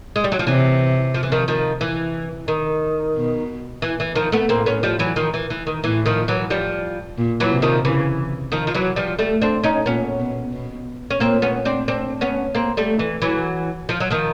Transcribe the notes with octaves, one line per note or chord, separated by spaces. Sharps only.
G#3
G3
F#3
F3
C3 E3
F3
E3
D#3 F3
D#3 F3
E3
D#3
B2
E3
E3
D#3 F3
A3 B3
A2 A#3 C4
B3 C#4
F3 G3
E3 F#3
D#3 F3
E3
E3
D#3
A2 E3
D#3 F3
E3 F#3
F3 G3
A#2
E3 F#3
C3
D#3 F3
C#3 E3
D#3 F3
F3
E3 F#3
F3 G3
G3 A3
C4 D4
C#4 D#4
A#2 B3 C#4
B2
B2
C#4
A#2 A#3 C4
B3 C#4
C4 D4
C4 D4
B3 C#4
A#3 C4
G3 A3
E3
E3 F#3
F3
F#3
D#3 F3